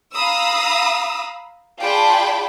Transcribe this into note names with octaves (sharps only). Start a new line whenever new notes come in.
F5 A#5 B5 D#6 E6
F4 G#4 D5 G5 A5 B5